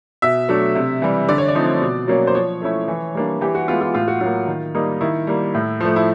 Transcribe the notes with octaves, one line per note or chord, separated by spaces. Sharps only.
B2 E5
F#3 A3 D4
C3
E3 G3
D3 D5
C#5
D5
F3 A3 C4 D#4
B2
F#3 A#3 C#4
C5
F3 C#5
A3 C#4 E4
E3
G3 A#3 D4
E3 G4
F#4
G#3 B3 F4
F4
A2 F4
F#4
F#3 A#3 F4
D#3
G3 A#3 D#4
D#3 E4
G3 A#3
A2
F3 A3
E4